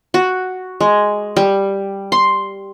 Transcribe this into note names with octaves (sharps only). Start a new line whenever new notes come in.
F#4
G#3
G3
C6